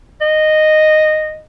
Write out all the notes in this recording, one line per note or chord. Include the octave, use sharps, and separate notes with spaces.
D#5